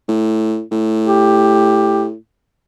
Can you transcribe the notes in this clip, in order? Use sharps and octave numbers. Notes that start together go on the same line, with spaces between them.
A2
A2
G4